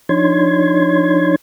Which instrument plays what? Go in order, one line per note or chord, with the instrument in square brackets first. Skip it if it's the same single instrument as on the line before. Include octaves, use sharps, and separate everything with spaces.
[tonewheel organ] F3 D4 D#4 C#5 C6 G#6